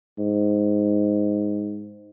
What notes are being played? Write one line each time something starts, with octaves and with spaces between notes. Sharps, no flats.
G#2